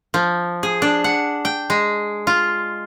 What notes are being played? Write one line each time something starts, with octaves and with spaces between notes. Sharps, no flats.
F3
G#4
D4
F#5
G5
G#3
F4